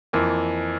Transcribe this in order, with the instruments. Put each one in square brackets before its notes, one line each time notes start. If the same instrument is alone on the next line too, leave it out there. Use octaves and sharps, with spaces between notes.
[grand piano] F2 E3 A#3